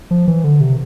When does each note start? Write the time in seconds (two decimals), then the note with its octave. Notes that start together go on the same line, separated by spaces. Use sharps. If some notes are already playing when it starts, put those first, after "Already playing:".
0.11 F3
0.28 E3
0.44 D3
0.61 C3